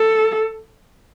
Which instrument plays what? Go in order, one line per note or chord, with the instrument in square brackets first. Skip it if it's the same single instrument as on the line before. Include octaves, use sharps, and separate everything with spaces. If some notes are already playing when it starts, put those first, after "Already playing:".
Already playing: [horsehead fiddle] A4